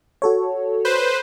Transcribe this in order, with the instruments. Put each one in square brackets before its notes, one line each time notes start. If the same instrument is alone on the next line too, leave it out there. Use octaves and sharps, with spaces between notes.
[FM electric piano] F#4 A4 C#5
[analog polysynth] B4 C5